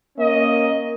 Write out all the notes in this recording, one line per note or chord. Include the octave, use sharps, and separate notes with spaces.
A#3 C#4 D#5